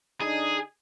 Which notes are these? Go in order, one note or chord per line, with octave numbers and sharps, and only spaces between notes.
D3 D4 D#4 G#4